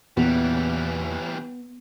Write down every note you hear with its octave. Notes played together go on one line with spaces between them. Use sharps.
E2 A#2 C#3 E3 G3 B3